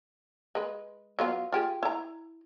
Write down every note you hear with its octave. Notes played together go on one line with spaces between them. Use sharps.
G#3 B4
F#3 B3 F4
F4 G4 G#4
E4 A#5